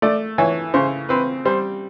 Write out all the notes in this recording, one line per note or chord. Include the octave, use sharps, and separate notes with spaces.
A3 D5
E3 C#5
C#3 C5
C4 B4
G3 C5